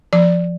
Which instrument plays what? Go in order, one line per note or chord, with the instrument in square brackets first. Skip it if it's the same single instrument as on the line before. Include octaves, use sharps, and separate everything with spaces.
[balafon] F3 D5